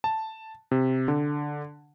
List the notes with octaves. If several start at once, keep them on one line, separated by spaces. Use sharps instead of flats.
A5
C3
D3